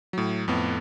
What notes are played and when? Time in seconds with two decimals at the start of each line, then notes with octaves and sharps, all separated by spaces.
0.13 A2 F#3
0.48 F2 A2 B3